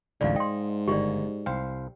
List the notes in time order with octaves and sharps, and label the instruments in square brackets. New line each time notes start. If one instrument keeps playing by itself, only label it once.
[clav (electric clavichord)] A1 D2 D3 [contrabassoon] G#2 [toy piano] D5 F5
[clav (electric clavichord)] D#5 [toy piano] G5 C6
[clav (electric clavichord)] G1 D#3 [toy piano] G4 D5
[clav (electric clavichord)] C2 C5 F5 [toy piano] G5